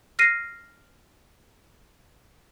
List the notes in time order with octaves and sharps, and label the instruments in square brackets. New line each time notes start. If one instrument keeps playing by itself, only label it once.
[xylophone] F6 A#6 C7 D#7